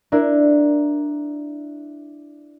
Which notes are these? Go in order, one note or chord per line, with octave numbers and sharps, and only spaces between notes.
D4 E4 A#4